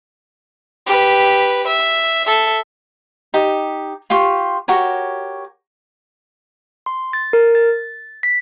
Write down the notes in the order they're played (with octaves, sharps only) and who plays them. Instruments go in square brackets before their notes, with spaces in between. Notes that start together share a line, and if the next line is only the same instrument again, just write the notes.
[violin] G4 B4
E5
A4 E5
[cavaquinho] D#4 G4
F4 G4 C6 C#6
F#4 G4 A#4 C#5
[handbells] C6
A6
A#4
A6
B6